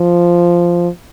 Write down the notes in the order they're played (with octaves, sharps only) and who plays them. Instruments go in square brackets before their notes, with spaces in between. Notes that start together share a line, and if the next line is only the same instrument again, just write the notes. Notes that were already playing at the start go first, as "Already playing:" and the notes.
Already playing: [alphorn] F3